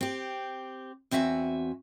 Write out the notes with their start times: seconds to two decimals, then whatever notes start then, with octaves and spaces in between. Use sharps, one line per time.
0.01 C4 G4
1.11 E2 C4 F#4 E5 G#5